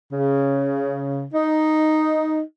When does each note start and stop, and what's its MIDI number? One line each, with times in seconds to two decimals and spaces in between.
0.13 1.24 49
1.34 2.41 63